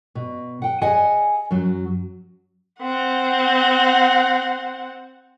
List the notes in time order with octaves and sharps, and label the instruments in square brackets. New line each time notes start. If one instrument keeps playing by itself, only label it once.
[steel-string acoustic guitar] B2
F#5 G5
G#4 D#5 F#5 G#5
F#2 F#3
[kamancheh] C4 F#5